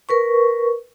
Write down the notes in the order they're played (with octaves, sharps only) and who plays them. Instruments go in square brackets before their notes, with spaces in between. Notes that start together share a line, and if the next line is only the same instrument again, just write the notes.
[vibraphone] A#4 B4 C#6